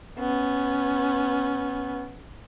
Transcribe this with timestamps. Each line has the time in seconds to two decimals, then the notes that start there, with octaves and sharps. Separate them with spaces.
0.20 B3 C#4